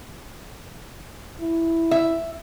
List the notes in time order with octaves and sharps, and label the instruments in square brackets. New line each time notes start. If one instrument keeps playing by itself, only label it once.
[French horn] E4
[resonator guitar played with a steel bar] E5